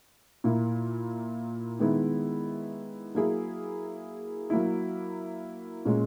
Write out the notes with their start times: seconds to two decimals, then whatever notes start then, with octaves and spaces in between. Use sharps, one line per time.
0.44 A#2 A#3 E4
1.79 D#3 G#3 B3 E4
3.15 F#3 A#3 E4 G#4
4.50 F#3 A#3 E4
5.85 A#2 G#3 C#4